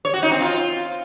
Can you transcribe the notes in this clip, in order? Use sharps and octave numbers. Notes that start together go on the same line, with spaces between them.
C#5
F#4
D#4
C4
F4